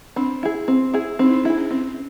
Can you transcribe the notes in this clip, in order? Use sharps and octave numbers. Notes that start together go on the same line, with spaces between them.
C4 D4
E4 G#4
C4
E4 G#4
C4 D#4
E4
D#4
D4 E4 G#4
C#4
C4 C#4